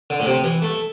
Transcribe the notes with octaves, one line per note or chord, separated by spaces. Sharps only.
D3
A2
C3
E3
A3